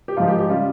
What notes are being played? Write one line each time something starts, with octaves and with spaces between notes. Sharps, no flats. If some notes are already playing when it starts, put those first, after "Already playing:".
G4
G#2 F3 G#3 F4
G4
G4
C#3 G3 F4